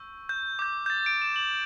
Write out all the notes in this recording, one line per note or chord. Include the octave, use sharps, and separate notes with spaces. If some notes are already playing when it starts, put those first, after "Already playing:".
Already playing: C#6 E6 G6
G6
D6 G6
G6
A6
D7
E7
F#7